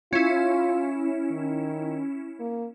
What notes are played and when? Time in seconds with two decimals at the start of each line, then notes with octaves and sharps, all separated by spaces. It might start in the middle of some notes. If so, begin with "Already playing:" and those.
0.13 C#4 E4 F4
1.31 D#3
2.40 A#3